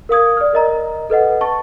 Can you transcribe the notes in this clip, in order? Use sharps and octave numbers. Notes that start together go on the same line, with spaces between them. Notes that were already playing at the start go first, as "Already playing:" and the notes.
A#4 F5 D#6 G#6
D5 F6
A#4 D#5 A#5
A4 B4 D#5 F#5
A5 C#6 A6